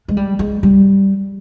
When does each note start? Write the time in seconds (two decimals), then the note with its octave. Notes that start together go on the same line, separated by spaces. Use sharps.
0.08 G#3
0.17 G3
0.39 G#3
0.63 G3